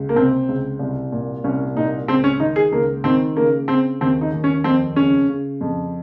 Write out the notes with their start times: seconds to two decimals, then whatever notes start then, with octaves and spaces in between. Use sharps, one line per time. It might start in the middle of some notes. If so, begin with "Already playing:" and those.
Already playing: C#2
0.09 A#3
0.15 C3 C4
0.48 C#2
0.79 C2
1.12 A#2
1.44 C2 C#4
1.76 A#2 D#4
2.08 C#2 C4
2.24 C#4
2.40 D#3 D#4
2.56 G#4
2.72 C#2 A#3
3.04 D#3 C4
3.36 C#3 A#3
3.68 C#3 C4
4.01 D#2 C4
4.21 D#4
4.33 D#2
4.44 C#4
4.64 F2 C4
4.96 C#3 C#4
5.28 C#3
5.61 F2